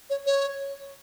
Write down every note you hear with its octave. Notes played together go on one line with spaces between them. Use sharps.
C#5
C#5